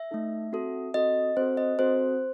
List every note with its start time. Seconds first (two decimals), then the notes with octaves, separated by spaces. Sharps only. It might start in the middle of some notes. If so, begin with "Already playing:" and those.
Already playing: E5
0.11 A3 D#4 A4
0.52 C4 F#4 A4
0.94 C4 F#4 A4 D#5
1.37 C4 F#4 A4 C5
1.57 D#5
1.79 C4 F#4 A4 C5